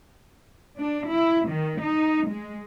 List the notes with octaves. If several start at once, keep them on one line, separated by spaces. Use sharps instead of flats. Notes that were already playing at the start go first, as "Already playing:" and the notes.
D4
E4
D#3
D#4
G#3